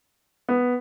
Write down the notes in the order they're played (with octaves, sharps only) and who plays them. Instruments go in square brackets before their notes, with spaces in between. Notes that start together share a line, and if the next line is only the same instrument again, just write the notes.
[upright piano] B3